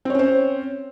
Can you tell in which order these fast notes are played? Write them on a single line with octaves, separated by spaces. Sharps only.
C4 C#5 C#4 C5